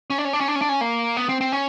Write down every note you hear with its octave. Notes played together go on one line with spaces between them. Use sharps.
C#4
D4
C#4
D4
C#4
D4
C#4
D4
C#4
A#3
B3
C4
C4
C#4